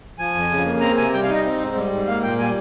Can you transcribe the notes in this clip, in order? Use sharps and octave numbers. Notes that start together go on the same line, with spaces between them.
F3 G#5
F2
C#3
A#3
C4 A#5
C3 G#5
G3 G5
F5
D#4 D#5
C4
G#2
G3
G#2
A#3 F5
A#2 G5
G3 G#5